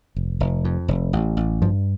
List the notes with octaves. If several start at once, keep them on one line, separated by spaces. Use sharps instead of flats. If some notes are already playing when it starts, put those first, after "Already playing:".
F1
F1
F2
F1
A1
A1
G2 F3